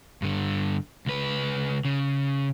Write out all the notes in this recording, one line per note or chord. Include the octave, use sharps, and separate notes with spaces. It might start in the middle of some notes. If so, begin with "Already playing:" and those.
G2 D3
C#2 B4
C#3